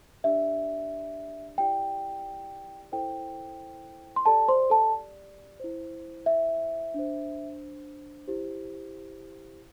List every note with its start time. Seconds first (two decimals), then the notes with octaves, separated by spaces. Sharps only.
0.24 D4 G4 D5 E5
1.58 E4 G4 D5 G5
2.92 E4 A4 C5 G5
4.16 C6
4.26 G4 A4 D5 A5
4.48 C5 C6
4.70 A4 A5
5.60 E4 C5
6.26 E5
6.94 D4 C5
8.28 E4 G4 C5